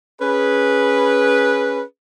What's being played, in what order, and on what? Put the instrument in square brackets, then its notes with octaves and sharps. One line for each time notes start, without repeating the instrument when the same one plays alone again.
[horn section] C#4 G#4 B4